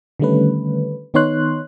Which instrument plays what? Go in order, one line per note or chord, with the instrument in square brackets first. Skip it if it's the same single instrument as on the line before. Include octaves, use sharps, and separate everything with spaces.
[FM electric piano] D3 D#3 G3 A3 C#4 B4
D#3 B3 D#4 C#5 C6 F#6